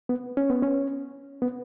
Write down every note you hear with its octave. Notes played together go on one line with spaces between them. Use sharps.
B3
C#4
B3
C#4
B3